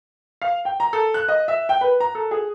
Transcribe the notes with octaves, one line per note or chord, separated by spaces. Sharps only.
F5
G5
A#5
A4
F#6
D#5
E5
G5
B4
A#5
A4
G#4